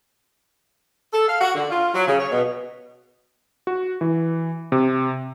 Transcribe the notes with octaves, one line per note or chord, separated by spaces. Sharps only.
A4
F5
F#4
D3
F4
F#3
C#3
C#5
B2
F#4
E3
C3